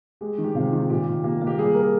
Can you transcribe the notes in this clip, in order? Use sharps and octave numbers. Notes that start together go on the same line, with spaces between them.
G#3 G4
D#3
G4
C3 F4
D#3
A#2 G4
A#2
A#3 G4
A#3
G4
G3 G#4
A#4
G#4